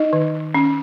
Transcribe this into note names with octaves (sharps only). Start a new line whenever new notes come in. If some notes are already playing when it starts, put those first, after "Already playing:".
Already playing: D#4 D#5
D#3
C#4